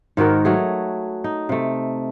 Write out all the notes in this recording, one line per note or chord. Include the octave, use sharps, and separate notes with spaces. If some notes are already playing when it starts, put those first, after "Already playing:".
G#2 D#3 F#4 A#4
F#3 A3 G#4
D#4
C3 A3